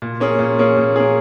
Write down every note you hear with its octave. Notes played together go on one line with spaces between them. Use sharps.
A#2
A#3 C#4 G#4
A#2
A#3 C#4 G#4
A#2
A#3 C#4 G#4